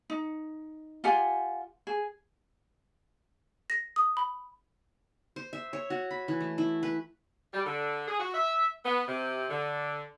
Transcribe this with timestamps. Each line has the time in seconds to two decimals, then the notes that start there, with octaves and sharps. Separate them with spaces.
0.10 D#4
1.04 F4 G4 F#5 G#5
1.87 G#4
3.70 A#6
3.96 D#6
4.17 B5
5.36 C5
5.53 E5
5.73 C#5
5.90 F#4
6.11 B5
6.28 E3
6.40 A3
6.58 E4
6.83 B4
7.53 G3
7.65 D3
8.08 G#4
8.20 F#4
8.34 E5
8.85 B3
9.08 C3
9.50 D3